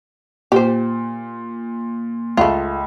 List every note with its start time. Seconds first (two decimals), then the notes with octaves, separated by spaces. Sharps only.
0.52 A#2 G4 C5
2.37 C#2 A3 F4